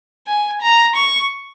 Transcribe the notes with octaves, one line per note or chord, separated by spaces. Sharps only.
G#5
A#5
C#6